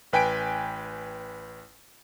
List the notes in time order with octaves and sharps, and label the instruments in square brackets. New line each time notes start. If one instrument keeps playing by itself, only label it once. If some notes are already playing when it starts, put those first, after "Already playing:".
[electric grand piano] A1 B4 G5 G#5 B6 D7